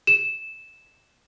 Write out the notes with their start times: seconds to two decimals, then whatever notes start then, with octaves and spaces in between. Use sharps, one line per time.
0.07 E7